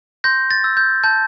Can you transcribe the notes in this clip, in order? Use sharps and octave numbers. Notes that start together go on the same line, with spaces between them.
C6 G6 A#6
A6
E6 G6
G6
A5 G6